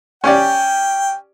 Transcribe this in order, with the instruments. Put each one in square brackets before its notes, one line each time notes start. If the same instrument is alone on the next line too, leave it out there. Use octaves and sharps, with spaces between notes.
[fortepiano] C#4 G4 D5 [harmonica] G5